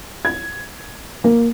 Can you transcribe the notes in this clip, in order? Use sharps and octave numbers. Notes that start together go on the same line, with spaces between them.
G#6
A#3